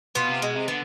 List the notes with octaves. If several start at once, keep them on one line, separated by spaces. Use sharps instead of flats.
B2 B3 F4
C3
B2 G#3
C3
D3 B3